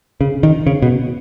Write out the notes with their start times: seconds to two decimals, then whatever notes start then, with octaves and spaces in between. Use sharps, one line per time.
0.21 C#3
0.43 D#3
0.67 C#3
0.82 B2